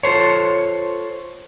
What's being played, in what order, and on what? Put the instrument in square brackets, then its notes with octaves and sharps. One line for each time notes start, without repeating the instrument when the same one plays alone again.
[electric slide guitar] F4 A4 C5 C#5